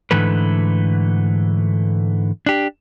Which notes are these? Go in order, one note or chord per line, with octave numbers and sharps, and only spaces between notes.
G#2 D3 E3 A3 B4
D4 G4